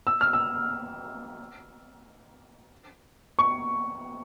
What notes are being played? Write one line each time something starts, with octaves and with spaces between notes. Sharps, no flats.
E6
F6
E6
C#6